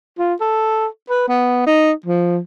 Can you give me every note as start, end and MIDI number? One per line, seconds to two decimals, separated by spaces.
0.18 0.34 65
0.41 0.87 69
1.10 1.25 71
1.28 1.61 59
1.66 1.91 63
2.06 2.38 53